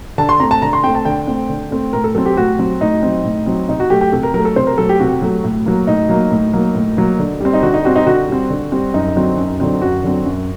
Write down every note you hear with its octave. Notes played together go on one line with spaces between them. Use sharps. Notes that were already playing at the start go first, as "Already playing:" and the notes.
D3 A5
C6
A3 C4 A#5
A5
D3 A#5
C6
A3 C4 G5
A5
D3 G5
A3 C4
D3
A3 C4
A2 A#4
A4
F#3 C4 A4
G4
A2 F#4
F#3 C4
A2 D#4
F#3 C4
A2
F#3 C4
C3 D#4
F#4
F#3 A3 G4
G4
C3 A4
A#4
F#3 A3 A#4
A4
C3 C5
A#4
F#3 A3 A4
G4
C3 F#4
F#3 A3
A2
F#3 A#3
A2 D#4
F#3 A#3
A2
F#3 A#3
A2
F#3 A#3
D3
G3 C4
D#4
D3 F#4
D#4
G3 C4 F#4
D#4
D3 F#4
G3 C4
D3
G3 C4
F#2 D#4
D3 F#3 C4
F#2
D3 F#3 C4
F#2 F#4
D3 F#3 C4
F#2